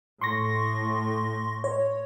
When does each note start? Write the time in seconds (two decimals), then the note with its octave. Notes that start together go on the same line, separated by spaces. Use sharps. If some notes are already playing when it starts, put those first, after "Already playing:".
0.21 A2 C6 C#6 A#6
1.64 C#5